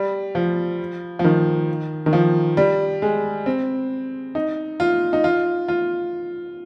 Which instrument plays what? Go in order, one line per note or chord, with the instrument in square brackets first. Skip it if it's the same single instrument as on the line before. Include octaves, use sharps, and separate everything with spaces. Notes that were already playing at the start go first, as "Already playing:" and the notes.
Already playing: [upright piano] G3
F3
F3
D#3
D#3
F3
G3
G#3
C4
D#4
F4
D#4
F4
F4